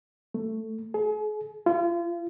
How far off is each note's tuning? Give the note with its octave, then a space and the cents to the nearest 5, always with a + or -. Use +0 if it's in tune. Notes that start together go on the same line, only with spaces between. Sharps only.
A3 +10
G#4 +40
F4 -35